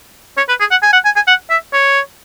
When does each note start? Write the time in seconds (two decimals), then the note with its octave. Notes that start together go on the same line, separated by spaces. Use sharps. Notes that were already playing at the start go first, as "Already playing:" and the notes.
0.37 C#5
0.48 B4
0.60 G#4
0.71 F#5
0.82 G#5
0.93 F#5
1.05 G#5
1.16 G#5
1.27 F#5
1.50 E5
1.73 C#5